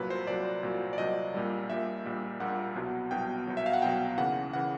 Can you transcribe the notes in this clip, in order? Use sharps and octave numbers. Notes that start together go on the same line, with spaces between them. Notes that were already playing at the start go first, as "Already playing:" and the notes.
Already playing: C2 A#2 F#3 B4
C5
C2 A#2 F#3 D5
C2 A#2 F#3
D5
C2 A#2 F#3 D#5
A#1 A#2 G3
A#1 A#2 G3 E5
A#1 A#2 G3
A#1 A#2 G3 F#5
C2 B2 F#3
C2 B2 F#3 G5
C2 B2 F#3
E5
F5
F#5
C2 B2 F#3 G5
D#2 C#3 E3 F#5
C#3 E3 F#5